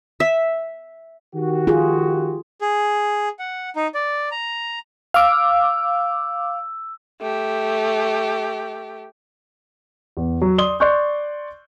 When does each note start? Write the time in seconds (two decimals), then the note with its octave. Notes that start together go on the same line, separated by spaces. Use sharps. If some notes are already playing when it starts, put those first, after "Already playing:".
0.20 E5
1.35 D#3 F#4 G4
1.67 F4 G#4
2.61 G#4
3.39 F#5
3.76 D#4
3.94 D5
4.31 A#5
5.14 F5 D6 E6
7.21 A3 G4
10.17 E2
10.42 F#3
10.58 D5 C6 D#6 G7
10.80 D5 C6 C#6 F#6 G6